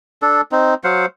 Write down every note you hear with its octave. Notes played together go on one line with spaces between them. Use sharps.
D4 A4
C4 D#4
F#3 C5 F5 F#5